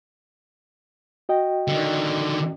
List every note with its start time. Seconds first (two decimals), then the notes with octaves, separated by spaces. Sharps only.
1.29 F#4 D#5 G5
1.68 D3 D#3